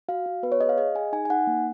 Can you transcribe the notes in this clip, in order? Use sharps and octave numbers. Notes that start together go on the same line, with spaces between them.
F#4 F5
F#4
B3 B4
C#5
G#4 D#5
F5
G#4 D#5
G#4 G#5
D#4 G#5
G#5
D#4 F#5
A#3